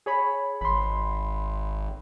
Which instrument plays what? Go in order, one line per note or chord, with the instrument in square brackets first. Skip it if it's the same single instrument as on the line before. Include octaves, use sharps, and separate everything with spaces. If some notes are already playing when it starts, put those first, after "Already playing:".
[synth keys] G#4 C#5 B5
[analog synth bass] G#1 [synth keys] B5 C6